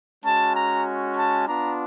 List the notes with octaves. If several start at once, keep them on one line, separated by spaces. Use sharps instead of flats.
G#3 C#4 F#4 A5
A#5
A5
B3 D4 F4 A#5